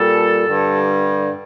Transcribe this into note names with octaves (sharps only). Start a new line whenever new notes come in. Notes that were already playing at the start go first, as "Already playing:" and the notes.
Already playing: A#2 G3 A4
G2 D3 G3